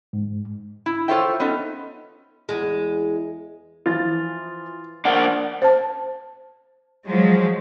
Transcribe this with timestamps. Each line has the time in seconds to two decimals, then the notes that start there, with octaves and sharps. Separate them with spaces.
0.13 G#2
0.86 E4
1.08 F4 A4 C5 C#5 E5 G5
1.40 B3 C#4 D#4 A4
2.49 E2 G#3
3.86 E3 F3 F4 A6
5.05 A#3 D4 F#5
5.62 C5 A5
7.06 F3 F#3 G#3